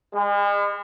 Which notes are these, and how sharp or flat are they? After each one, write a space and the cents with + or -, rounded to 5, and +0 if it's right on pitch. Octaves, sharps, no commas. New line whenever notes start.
G#3 -40